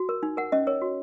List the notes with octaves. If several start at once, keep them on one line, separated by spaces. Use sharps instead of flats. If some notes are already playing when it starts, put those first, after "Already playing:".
Already playing: F#4
A#4
D#4
A#4 F#5
C#4 D#5
A#4 C#5
F#4